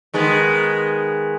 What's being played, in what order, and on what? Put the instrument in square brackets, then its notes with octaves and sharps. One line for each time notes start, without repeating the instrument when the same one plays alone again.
[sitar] D#3 G#3 B3